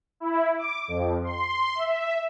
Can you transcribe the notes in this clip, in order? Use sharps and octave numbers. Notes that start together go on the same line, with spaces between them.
E4
D6
F2
C6
E5